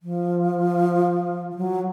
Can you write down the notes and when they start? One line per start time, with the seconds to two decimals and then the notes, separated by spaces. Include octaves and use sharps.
0.03 F3
1.51 F3
1.56 F#3